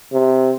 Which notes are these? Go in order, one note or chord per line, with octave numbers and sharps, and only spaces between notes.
C3